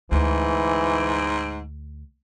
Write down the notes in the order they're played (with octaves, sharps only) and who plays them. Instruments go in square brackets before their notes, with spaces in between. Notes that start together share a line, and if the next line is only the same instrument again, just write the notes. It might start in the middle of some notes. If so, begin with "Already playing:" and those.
[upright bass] D2 [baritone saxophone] G#2 [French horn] E3